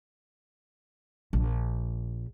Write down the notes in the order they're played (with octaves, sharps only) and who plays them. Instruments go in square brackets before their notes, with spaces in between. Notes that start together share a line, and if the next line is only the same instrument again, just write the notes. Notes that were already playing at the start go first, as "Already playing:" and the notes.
[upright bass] A#1